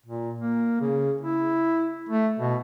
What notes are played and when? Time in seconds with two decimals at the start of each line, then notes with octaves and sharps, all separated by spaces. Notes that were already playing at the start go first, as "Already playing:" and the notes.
0.06 A#2
0.40 A#3
0.80 C#3
1.21 E4
2.09 A3
2.39 B2